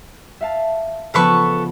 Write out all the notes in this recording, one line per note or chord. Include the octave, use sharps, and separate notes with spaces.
E5 F5 A5
C#3 F3 B3 A4 B4 C#6